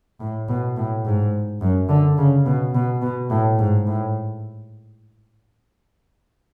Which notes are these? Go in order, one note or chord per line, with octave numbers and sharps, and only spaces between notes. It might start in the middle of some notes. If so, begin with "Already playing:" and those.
A2
B2
A2
G#2
F#2
D3
C#3
B2
B2
B2
A2
G#2
A2